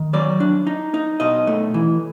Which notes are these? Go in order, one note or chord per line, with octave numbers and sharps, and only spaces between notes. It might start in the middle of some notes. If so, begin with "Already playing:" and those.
Already playing: D#3
F#3 D5
D4
D#4
D#4
B2 D#5
A3
E3